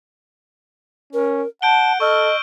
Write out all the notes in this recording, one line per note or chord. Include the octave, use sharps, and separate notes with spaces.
C#4 A#4
F#5 A5 G6 D7 G7
A4 D#5 C#6 E6 F6